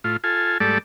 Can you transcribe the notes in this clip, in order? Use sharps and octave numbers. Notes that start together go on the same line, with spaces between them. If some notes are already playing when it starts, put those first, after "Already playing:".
A2 F4
F4 A4 G#5
G#2 G3 A3 A4 D5